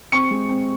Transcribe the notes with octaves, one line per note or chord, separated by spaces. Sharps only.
C4 C#6 C#7
G#3
C4